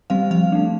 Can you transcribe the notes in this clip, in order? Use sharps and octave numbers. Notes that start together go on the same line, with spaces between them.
G3 C4 F5
F3 F5
A3 D4